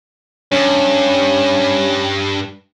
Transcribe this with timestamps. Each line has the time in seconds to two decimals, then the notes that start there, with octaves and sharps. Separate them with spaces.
0.52 G2 C#4